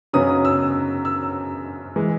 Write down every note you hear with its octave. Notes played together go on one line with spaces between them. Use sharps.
F#2 C#3 F#3 B3 D#4 D#6
E6
E6
E3 G#3